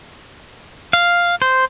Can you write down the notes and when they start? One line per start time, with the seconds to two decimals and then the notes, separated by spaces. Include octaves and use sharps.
0.93 F5
1.42 C5